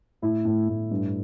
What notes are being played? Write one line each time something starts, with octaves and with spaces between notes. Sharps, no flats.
A2 E4
A2
A2
G2